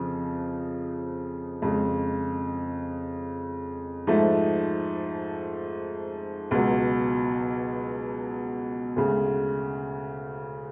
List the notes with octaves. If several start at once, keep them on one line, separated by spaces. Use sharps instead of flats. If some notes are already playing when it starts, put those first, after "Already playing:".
Already playing: F2 C#3 F3
F2 C#3 G#3
G#2 F3 A3
C#2 B2 F#3
D2 C#3 G#3